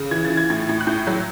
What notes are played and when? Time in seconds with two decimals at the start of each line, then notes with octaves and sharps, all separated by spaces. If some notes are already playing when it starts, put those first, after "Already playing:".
Already playing: C#3
0.11 E3 G#6
0.25 A6
0.30 E3
0.37 G#6
0.50 A2 G#6
0.69 A2
0.81 F#6
0.87 A2 G6
1.07 F#3